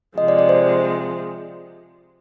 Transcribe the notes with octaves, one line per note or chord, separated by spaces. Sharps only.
C3 F3 G#3 D#5
D5
D5
C5